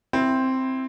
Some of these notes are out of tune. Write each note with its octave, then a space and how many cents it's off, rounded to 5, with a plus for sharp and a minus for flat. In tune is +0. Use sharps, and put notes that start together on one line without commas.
C4 +0 E4 +0